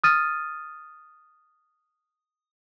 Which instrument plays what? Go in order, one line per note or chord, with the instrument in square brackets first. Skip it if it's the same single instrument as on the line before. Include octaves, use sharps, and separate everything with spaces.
[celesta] D#6 F6 A6 D#7